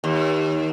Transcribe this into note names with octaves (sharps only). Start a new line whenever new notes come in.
D#2